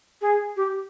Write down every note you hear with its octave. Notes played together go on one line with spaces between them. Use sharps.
G#4
G4